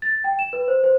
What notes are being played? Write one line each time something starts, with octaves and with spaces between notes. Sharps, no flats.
A6
G5
E7
B4
C5
C5